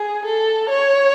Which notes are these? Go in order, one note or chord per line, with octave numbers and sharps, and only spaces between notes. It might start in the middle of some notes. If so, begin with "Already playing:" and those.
Already playing: G#4
A4
C#5